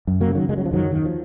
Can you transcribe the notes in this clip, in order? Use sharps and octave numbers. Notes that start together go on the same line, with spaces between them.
F#2
F#3 A#3
C#3
D#3 F#3
C#3 G#3
F#3
F3
F#2 D#3 F#3
D#2 D#3
F3